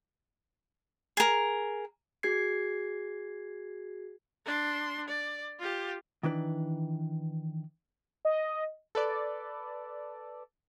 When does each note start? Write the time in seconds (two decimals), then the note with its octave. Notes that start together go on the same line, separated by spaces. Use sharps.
1.17 G#4 A#4
2.23 F#4 G#4 G#6 C7
4.45 D4 C6
5.08 D5
5.59 F4 G4
6.23 D#3 E3 D4 B4
8.25 D#5
8.95 A4 B4 D5